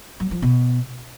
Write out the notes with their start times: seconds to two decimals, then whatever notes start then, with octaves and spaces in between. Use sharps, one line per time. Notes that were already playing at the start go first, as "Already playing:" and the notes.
0.20 F#3
0.31 F3
0.42 B2